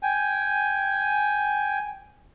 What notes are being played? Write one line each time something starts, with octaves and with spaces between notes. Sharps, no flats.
G5 G#5